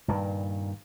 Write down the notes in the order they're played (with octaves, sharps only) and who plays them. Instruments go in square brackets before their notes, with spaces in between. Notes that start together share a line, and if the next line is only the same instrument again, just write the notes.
[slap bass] G2 A#2 D#3